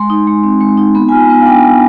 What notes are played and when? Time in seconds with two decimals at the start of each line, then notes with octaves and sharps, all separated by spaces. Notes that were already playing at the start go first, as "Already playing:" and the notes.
Already playing: G#3 C6
0.10 D#4
0.27 G#3
0.43 C4
0.61 G#3
0.78 D#4
0.95 B3 B5
1.09 F4 G#5
1.29 B3 G#5
1.41 F5
1.46 D4 G5
1.63 B3